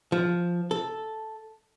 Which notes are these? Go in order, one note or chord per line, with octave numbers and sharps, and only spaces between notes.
F3
A4